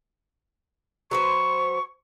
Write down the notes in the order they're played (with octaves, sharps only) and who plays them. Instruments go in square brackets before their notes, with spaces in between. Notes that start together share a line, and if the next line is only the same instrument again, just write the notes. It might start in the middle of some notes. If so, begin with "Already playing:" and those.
[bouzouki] F#3 B4 C5 [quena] C#6